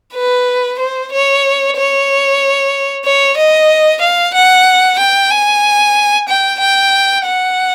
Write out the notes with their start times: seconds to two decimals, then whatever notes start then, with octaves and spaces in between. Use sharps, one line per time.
0.15 B4
0.79 C5
1.12 C#5
1.76 C#5
3.05 C#5
3.38 D#5
4.01 F5
4.35 F#5
4.98 G5
5.31 G#5
6.28 G5
6.60 G5
7.25 F#5